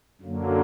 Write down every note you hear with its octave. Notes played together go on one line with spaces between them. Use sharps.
F#2 D3 F#3 A#3